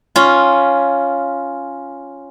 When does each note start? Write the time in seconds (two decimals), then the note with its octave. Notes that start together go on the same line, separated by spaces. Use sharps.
0.16 C#4 F4